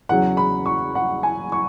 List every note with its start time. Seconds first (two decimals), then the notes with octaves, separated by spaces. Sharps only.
0.09 E2 C#3 F#3 F#5
0.37 B5
0.66 C#6
0.95 F#5
1.23 G#5
1.52 C#6